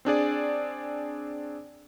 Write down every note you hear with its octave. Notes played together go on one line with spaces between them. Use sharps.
C4 D4 G#4 D5